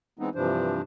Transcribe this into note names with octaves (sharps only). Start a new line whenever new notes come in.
E3 G#3 B3 C4 D#4
G2 C3 E3 F3 D4 C5